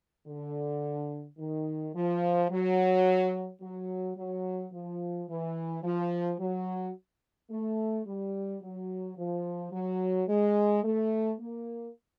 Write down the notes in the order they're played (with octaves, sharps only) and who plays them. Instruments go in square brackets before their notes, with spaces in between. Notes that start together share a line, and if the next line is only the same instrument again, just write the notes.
[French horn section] D3
D#3
F3
F#3
F#3
F#3
F3
E3
F3
F#3
A3
G3
F#3
F3
F#3
G#3
A3
A#3